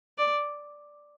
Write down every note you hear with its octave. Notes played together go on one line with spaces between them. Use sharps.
D5